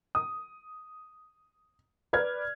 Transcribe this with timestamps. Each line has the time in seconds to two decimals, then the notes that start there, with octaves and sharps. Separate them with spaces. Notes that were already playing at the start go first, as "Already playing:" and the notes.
0.15 D#6
2.13 B4 D5 F6 G#6